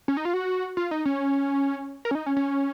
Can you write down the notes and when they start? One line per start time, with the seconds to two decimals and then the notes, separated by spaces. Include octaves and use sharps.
0.08 C#4
0.17 D#4
0.25 F4
0.33 F#4
0.77 F4
0.91 D#4
1.05 C#4
2.05 A#4
2.11 C#4
2.15 D#4
2.26 C#4
2.37 C#4